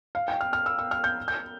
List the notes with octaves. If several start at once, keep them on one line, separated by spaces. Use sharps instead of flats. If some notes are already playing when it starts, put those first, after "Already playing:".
F5
G5
F6
F6
E6
E6
F6
G6
G6